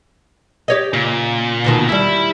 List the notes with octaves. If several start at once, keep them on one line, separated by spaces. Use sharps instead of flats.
G4 C#5 D#5
A#2 C#3
D2 B2 D#3
D#2 G3 E4